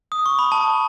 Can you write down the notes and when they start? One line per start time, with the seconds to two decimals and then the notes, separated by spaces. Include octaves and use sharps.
0.12 D#6
0.26 C#6
0.39 B5
0.52 A5